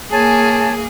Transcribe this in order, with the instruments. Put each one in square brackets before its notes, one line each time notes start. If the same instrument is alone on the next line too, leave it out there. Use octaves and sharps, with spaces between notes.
[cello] A#3 G#4 [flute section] C#5 G#5 A5